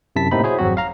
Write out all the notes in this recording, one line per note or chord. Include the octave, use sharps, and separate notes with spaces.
F#2 C3 E4 A5 B6
A2 C3 A#3 C4 D#4 B5
E4 F#4 G#4 C5 C#5
G#1 F2 F#3 C4 F#4
F5 A#5